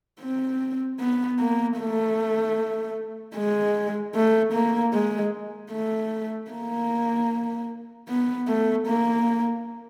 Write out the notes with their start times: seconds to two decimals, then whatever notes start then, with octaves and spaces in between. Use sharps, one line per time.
0.21 C4
1.00 B3
1.40 A#3
1.79 A3
3.36 G#3
4.15 A3
4.53 A#3
4.94 G#3
5.72 A3
6.51 A#3
8.08 B3
8.48 A3
8.87 A#3